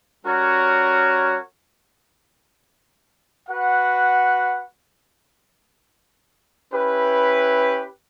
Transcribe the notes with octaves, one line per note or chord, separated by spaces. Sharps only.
G3 C#4 F#4 A#4 C#5
F#4 B4 F#5
C#4 E4 G4 B4